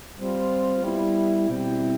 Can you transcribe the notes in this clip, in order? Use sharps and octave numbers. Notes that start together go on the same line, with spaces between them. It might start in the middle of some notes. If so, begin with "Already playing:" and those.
G3 C4 F4 C5
G3 B3 E4
B2 G3 C4 E4